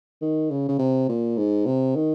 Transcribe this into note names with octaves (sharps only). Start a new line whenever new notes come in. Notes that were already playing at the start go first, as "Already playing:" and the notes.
D#3
C#3
C#3
C3
A#2
G#2
C3
D#3